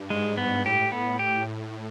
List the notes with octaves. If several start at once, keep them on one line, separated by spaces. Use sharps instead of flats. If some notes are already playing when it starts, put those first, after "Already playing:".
Already playing: G2
G#2 G#3
B3
A2 G4
B3
G4